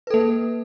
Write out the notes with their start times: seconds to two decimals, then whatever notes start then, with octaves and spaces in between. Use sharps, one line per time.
0.07 B4
0.10 A4
0.14 A#3